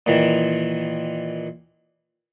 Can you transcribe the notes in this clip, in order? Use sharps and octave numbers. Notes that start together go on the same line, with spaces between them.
A#2 D#3 E3